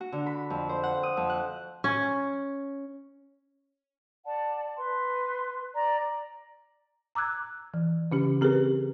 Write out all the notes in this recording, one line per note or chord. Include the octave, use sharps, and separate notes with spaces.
F#4
D3
B5
F2
C5
F#5
D#6
F2
F#6
C#4
D5 F#5 A5
B4 C6
D5 A#5
A#5 D6 E6 F#6 G#6
E3
C#3 C#4 G4
C4 G4 G#4 A#4 B4